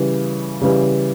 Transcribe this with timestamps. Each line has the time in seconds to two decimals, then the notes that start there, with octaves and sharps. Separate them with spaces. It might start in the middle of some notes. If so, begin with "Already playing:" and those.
Already playing: C#3 E3 G3
0.62 C#3 E3 G3